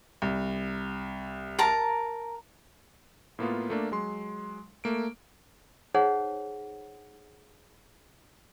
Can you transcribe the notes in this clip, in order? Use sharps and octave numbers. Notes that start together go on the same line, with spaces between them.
C2
A#4 A5 A#5
A2 A#3 B3 F4
A3 A#3 D4
F#3 G#3 C6
A3 A#3 D7
D#4 G#4 C5 C#5 F#5